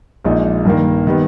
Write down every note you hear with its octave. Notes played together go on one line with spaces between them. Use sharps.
A#1 A#2 G#3 D#4
G2 D#3 A#3
D#3 G3 B3